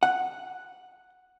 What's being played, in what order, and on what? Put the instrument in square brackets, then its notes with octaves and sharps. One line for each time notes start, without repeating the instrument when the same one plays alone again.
[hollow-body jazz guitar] F#5